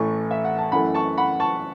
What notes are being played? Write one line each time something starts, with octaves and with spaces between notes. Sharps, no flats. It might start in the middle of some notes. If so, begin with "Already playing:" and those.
Already playing: A1 A2 E3 A3 C#6
E5
F#5
A5
F#2 E3 A3 F#5 B5
A5 C#6
F#5 B5
A5 C#6